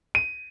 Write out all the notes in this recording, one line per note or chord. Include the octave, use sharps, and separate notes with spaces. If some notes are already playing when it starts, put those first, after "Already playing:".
D#7